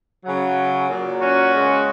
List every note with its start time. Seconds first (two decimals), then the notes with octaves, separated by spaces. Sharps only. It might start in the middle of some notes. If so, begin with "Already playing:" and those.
0.24 C#3 F#3
0.87 A#2 F#3
1.20 C#4 F#4
1.52 C#3 G#3